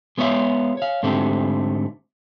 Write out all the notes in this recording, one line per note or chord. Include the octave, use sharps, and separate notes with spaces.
G#3 B3 F4 C#5 E5 F5
C#5 F5
G#2 D3 A3 C4 G4